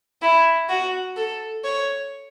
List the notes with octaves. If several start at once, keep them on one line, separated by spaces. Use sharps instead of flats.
E4
F#4
A4
C#5